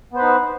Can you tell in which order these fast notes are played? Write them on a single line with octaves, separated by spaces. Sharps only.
B3 C5 B4 D#4